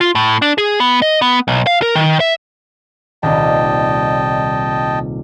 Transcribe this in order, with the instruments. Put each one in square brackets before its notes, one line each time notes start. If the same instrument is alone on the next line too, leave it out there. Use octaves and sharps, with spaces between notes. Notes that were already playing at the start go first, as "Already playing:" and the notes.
[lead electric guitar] F4
A2
D4
G#4
B3
D#5
B3
B1
F5
A#4
D#3
E5
[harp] D#1 C2 [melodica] D#5 G5 A5